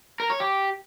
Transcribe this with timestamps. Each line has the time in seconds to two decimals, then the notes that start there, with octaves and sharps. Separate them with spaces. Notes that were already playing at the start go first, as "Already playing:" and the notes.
0.20 A#4
0.30 C#5
0.40 G4